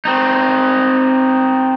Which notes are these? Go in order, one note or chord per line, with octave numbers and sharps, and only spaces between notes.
C4 D#4